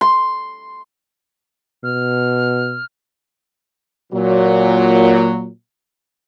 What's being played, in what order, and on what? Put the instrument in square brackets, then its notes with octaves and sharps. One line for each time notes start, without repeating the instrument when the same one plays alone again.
[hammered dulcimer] C6
[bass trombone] B2 [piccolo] F6
[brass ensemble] A#2 F#3